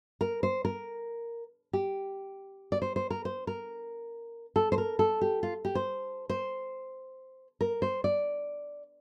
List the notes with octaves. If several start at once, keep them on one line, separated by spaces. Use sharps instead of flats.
A#4
C5
A#4
G4
D5
C5
C5
A#4
C5
A#4
A4
C5
A#4
A4
G4
F4
G4
C5
C5
A#4
C5
D5